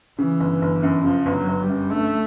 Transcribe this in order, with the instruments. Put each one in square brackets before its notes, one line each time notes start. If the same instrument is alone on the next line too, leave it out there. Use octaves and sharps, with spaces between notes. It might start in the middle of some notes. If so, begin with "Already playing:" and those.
[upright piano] C#3 [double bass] E3
[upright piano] G1
G1
F#2
[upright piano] C#3 [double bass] F3
[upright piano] G1
[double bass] F#3
[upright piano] G1
[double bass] G3
[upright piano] F#2
[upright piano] D3 [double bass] A3